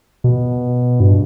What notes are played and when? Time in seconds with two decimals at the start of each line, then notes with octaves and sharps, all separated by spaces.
0.24 B2
1.00 G2